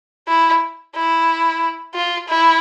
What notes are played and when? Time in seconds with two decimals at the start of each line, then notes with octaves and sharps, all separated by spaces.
0.28 E4
0.95 E4
1.94 F4
2.28 E4